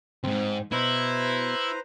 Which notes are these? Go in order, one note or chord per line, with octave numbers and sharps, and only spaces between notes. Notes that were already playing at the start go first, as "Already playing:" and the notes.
D2 G#2 C4
B2 E4 B4 C5 A#5